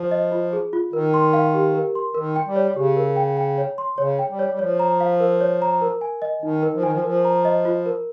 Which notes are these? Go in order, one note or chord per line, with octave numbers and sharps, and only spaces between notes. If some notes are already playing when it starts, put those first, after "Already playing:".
Already playing: F3
D#5
F4
G#4
F4
D#3 A#4
C6
F5
G4
A#4
C6
D#3 A#4
G5
G3
C#5
C#3 G4
A#4
G5
G5
C#5
C6
C#3 C#5
G5
G3
C#5
G3
F3 C#5
A#5
F5
A#4
C#5
A#5
A#4
G#5
D#5
D#3 D#4
A#4
F3
D#3 G#5
F3
F3 A#4
A#5
D#5
F4
A#4